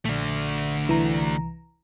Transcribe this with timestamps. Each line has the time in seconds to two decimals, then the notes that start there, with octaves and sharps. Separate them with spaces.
0.05 A#1 D3 A3
0.87 C2 E3 A#5